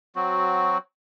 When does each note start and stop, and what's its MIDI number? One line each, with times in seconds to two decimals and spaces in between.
0.16 0.78 54
0.16 0.78 60
0.16 0.78 66